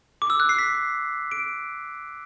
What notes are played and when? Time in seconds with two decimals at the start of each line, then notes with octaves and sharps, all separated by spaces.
0.22 D6
0.30 E6
0.40 F#6
0.49 C7
0.59 B6
1.31 D7